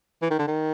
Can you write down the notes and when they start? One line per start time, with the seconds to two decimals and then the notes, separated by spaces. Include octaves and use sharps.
0.22 E3
0.31 D#3
0.39 D3
0.47 D#3